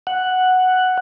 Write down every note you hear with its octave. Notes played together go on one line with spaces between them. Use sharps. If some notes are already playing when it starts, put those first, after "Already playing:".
F#5